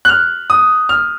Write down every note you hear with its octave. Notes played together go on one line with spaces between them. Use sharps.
F#6
F6
D#6
F6